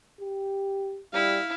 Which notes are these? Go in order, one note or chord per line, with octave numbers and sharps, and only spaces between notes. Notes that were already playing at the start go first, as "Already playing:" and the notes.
G4
G3 E4 F5